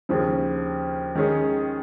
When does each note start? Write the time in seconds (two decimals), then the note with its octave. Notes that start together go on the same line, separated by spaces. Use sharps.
0.09 D#2 C#3 F3
1.15 D#3 G#3 C#4 G#4